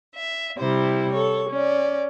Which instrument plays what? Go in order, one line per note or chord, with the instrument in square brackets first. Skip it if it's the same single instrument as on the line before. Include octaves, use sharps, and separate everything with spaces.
[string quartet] E5
C3 G3 E4 C5
A4 C#5
C#4 D5